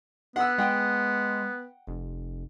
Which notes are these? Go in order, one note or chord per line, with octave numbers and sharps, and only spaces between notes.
B3 F#5 E6
G#3 F#5 G5
F1